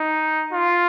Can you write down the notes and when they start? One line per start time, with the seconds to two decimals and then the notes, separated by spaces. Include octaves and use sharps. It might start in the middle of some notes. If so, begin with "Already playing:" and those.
Already playing: D#4
0.53 F4